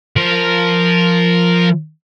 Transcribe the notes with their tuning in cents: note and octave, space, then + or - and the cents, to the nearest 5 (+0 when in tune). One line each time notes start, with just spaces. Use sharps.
F3 +0 A#4 -5